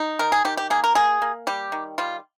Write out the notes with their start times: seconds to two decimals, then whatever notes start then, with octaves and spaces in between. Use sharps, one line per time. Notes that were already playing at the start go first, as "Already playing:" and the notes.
Already playing: D#4
0.19 D#3 A#4
0.32 G#4
0.45 D#3 G4
0.57 G4
0.70 A#3 G#4
0.84 A#4
0.95 A#3 G#4
1.22 A#3
1.47 G3 G4
1.72 D#3
1.98 G3 F4